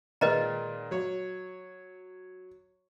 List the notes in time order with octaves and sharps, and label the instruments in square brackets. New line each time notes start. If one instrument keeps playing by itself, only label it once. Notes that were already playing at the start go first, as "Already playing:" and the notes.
[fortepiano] A#2 D#3 G#3 [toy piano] B4 D#5 A#5
[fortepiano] F#3 C#5